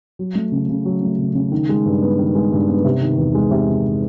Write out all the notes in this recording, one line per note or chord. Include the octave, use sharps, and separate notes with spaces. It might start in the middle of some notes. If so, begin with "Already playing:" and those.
F#3
A3
C#3
C#3
F#3
A3
C#3
C#3
D#3
G#3
G2
B3
D#3
G#3
G2
B3
C3
D#3
E2
G#3
C3
D#3